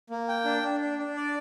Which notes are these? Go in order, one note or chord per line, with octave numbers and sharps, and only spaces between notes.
A#3
G5
D4
D4
D4
D4
D5